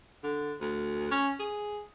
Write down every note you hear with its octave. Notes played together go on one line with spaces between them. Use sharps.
D3
D2
C#4
G#4